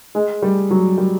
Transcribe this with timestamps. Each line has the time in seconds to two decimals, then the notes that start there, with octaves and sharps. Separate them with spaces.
0.15 G#3
0.42 G3
0.70 F#3
0.98 G3